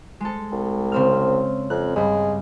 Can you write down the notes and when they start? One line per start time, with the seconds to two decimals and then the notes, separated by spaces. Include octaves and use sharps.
0.20 G#3 A4
0.52 C2
0.92 C#3 C4 F6
1.70 F2 F#6
1.96 G2 G3 G#3